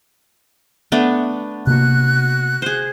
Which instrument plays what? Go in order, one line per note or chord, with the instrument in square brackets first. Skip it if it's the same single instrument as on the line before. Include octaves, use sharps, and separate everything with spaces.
[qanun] A3 B3 D4
[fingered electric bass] C3 A#3 [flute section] F#4 F#6
[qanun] G#4 C5